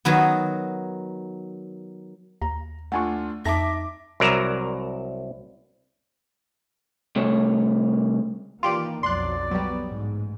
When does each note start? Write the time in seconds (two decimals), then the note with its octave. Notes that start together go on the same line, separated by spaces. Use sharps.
0.05 D#3 F#3 B3
2.42 D#2 A#5
2.92 A3 D4 F4 F#5 G#5 C#6
3.46 F2 D#4 E5 A5 D6 A#6
4.20 C2 F#3 A#4 D5 E5 A#5
7.16 C2 A3 C#5
8.63 D#3 E3 A#3 F4 G4 D5
9.03 B1 F2 F#3 D5 C6 F#6
9.51 F#3 G3 B3
9.84 A1 G#2